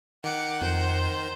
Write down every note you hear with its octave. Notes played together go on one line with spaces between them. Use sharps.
D#3 F#5 D6 C#7
F2 C5 G6